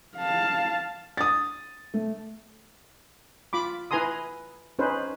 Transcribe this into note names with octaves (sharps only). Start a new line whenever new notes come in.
F5 A5
D#6 A6
A3
F4 B5 D6
E4 B4 G#5 A#5 C6 D#6
C#4 D#4 B4 C5